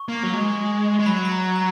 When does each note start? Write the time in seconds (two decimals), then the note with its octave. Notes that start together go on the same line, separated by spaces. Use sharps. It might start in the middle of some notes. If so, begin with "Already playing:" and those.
Already playing: C#6
0.09 A#3
0.23 F#3
0.33 G#3
0.99 G#3
1.06 F#3 B5
1.17 C#6
1.25 B5
1.32 A#5
1.56 A#5